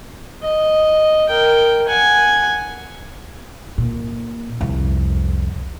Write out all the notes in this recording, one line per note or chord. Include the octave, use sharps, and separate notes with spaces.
D#5
A#4 G5
F#5 G#5
A#2
C2 F2